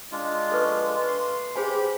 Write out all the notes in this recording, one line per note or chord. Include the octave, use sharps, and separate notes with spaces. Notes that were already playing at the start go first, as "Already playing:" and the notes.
G#3 D4 F4
A4 B4 C#6
C6
G4 G#4 C5 G#5 B5